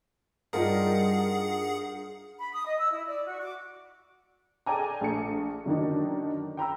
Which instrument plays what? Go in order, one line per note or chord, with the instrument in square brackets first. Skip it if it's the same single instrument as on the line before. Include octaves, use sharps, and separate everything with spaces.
[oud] G2 [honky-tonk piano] D#4 F4 A#4 [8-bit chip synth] G#4 F#5
[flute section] B5
D#6
D#5
E6
E4
D5
F#4
D6
[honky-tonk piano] G#4 A4 D5 G5 G#5 A#5
A#1 A3 C#7
F#2 D3 D#3 A#3 D4 D#4
G5 A#5 B5 E6